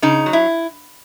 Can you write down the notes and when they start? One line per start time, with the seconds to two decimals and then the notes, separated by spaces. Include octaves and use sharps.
0.02 C#3 D#4
0.26 F#3
0.33 E4